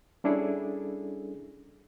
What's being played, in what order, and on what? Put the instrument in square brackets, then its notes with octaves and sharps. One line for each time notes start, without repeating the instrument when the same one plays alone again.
[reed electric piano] G3 C#4 D4 E4 G#4 A4